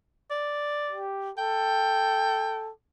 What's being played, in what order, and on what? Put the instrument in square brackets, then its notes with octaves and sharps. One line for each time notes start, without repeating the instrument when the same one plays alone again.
[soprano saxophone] D5
[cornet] G4
[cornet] A4 [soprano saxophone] G5